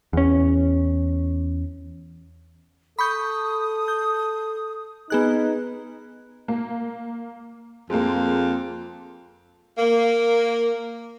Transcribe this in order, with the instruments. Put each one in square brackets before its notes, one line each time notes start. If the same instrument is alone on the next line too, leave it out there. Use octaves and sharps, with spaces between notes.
[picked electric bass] E2 C#4
[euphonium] A4 [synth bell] B5 C#6 G6 [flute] D#6
[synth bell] G6
[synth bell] B3 G#4 F#6 [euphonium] D#4 [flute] B4
[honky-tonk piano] A#3
[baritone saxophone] F2 [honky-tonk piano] G#3 A#3
[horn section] A#3